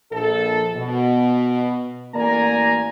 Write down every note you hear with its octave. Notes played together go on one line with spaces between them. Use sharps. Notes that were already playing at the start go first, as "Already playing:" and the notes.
A#1 A4
B2
A1 A#3 D5 G#5 A#5